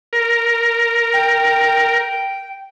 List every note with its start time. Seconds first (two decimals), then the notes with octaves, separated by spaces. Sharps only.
0.13 A#4
1.13 G5